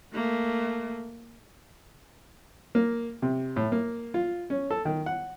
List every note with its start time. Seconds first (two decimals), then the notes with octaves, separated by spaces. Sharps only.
0.14 A3 A#3
2.75 A#3
3.22 C3
3.56 A2
3.72 A#3
4.14 F4
4.50 C#4
4.71 A4
4.85 D#3
5.06 F#5